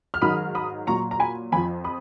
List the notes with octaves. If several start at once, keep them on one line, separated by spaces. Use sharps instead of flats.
F6
G#2 D#3 F#3 B5 D#6
B5 D#6
A#2 F#3 A#5 C#6
A#5
G#5 B5
F2 F3 G#5 B5
B5 D#6